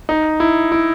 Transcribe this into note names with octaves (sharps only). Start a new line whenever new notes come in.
D#4
E4
E4